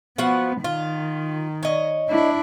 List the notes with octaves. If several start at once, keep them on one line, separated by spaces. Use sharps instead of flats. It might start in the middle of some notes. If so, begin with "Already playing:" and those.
F3 B3 F#4 F#5
D#3 F4
C#5 D#5
D4 E4